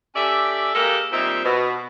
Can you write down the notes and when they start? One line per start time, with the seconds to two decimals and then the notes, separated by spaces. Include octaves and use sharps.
0.15 C#4 G4 A4 D5 E5
0.75 G#3 A#3 G4 A4 A#4
1.12 A#2 G3 C4 D#4 E5
1.44 B2